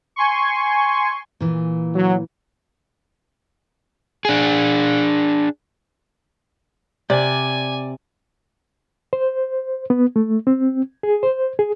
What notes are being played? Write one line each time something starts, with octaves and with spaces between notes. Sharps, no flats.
G#5 C6 C#6
A#2 E3
F#3
D4 G#4
C3 D5 G#5
C5
B3
A3
C4
G#4
C5
G#4